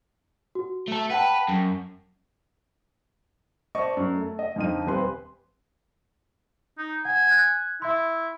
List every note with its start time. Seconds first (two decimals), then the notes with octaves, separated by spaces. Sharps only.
0.55 F#4
0.88 A3 A4
1.10 B4 F#5 G5 A5
1.49 F#2
3.75 C5 D5 D#5 A5 C#6
3.97 F#2
4.15 A3
4.39 D#5
4.56 F2 D3 F3 D#4 D#7
4.87 D#1 C4 G4 B4 G#5 C6
6.78 D#4
7.05 F#5 G#5
7.29 F#6 G#6
7.82 E4 E5 C6